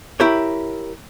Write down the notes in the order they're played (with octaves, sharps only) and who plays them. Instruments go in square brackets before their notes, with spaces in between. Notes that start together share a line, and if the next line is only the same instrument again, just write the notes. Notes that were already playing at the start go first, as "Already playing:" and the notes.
[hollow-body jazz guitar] E4 G4 A#4 C#5